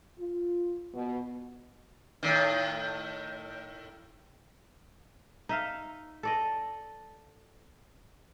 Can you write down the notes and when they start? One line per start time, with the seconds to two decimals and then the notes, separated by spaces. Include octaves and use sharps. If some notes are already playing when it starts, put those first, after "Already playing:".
0.18 F4
0.94 B2
2.23 A2 D#3
5.49 D#4 E5 F5
6.23 A4 D5 D#5